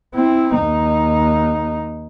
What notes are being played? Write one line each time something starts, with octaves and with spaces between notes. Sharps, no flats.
C4 E4
D#2 D#4